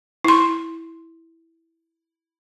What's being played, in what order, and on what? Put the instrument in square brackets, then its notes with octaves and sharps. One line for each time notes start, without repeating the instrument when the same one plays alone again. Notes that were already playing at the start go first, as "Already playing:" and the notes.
[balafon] E4 C6